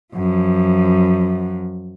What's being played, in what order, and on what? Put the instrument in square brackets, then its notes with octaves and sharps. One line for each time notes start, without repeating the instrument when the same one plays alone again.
[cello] F#2 F3